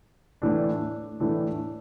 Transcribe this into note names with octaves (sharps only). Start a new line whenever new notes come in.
A2 E3 A3 D4
A2 E3 A3 D4